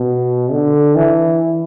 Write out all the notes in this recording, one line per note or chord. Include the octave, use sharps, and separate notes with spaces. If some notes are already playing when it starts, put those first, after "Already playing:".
Already playing: B2
D3
E3